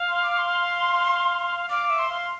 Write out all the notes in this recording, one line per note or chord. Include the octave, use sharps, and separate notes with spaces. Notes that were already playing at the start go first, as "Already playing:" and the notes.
Already playing: F5
C6
D6
C6
F5 D6
E5
C6
F5